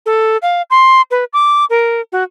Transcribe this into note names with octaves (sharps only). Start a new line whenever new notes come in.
A4
F5
C6
B4
D6
A#4
F#4